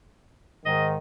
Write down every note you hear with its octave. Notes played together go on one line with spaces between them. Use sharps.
G#2 D#3 D#5